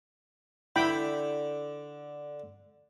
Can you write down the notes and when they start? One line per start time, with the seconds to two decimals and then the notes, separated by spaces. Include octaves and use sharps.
0.76 D3 E4 G5 B5